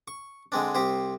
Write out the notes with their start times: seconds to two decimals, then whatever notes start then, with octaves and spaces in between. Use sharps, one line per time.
0.08 C#6
0.52 D3 G#3 C4 D4
0.75 C2 C4 G4 C5